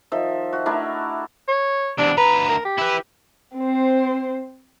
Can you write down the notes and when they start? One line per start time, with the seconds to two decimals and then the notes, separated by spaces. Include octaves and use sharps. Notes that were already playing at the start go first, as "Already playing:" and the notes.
0.12 D#3 F3 E5
0.53 F#4
0.66 A3 D4 E4 A#4
1.48 C#5
1.98 E2 C3 D4
2.17 D2 B4 A#5
2.49 A#4
2.65 G4
2.78 E4 B4
3.56 C4 C5